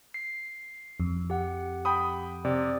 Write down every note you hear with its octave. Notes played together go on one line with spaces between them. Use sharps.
C7
F2
G4 F#5
G5 B5 D#6
C3 D5